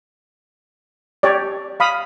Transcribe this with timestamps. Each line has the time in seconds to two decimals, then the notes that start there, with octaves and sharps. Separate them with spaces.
1.23 G4 C#5 D5
1.80 F5 B5 D#6